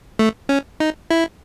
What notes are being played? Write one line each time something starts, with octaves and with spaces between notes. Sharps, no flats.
A3
C#4
D#4
E4